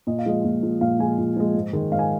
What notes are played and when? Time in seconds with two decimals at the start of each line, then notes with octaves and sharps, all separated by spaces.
0.07 A#2 D#5
0.19 F5
0.26 F3 G#3 D#5
0.44 A#2
0.63 F3 G#3
0.81 A#2 F5
0.99 F3 G#3 G#5
1.18 A#2
1.36 F3 G#3
1.54 G#2
1.73 D#3 G#3
1.92 G#2 F5
1.99 G#5